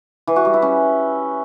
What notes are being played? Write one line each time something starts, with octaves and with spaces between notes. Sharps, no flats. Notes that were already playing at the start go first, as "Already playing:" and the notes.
E3
F#4
G3
E4
C#4